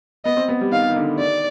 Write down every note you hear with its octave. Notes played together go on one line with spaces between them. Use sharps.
B3 D#5
C4
B3
G3
D#3 F5
D#3
D3
D#3 D5